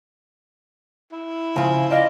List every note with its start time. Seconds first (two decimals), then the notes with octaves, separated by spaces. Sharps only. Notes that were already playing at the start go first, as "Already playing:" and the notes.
1.12 E4
1.56 C#3 F3 F4
1.91 D5 D#5 F5